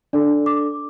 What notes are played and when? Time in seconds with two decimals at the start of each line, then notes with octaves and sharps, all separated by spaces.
0.13 D4 A4 D5
0.46 D6